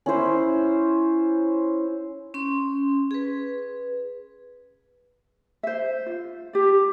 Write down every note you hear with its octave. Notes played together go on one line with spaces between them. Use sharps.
C#4 E4 C5
C#4 C6
G#4 B4
C5 E5
F4
G4 D5